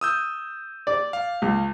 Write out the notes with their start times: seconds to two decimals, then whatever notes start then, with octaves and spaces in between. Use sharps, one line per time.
0.01 D#6 E6 G6
0.87 D5
1.13 F5
1.42 C#2